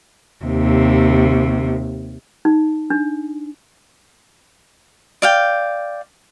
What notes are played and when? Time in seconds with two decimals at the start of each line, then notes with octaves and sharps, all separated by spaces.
0.45 D#2 C3
2.45 D#4
2.90 D4
5.22 D5 F5 G5